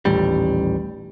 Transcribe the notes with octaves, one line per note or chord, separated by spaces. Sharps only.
D#1 A1 G3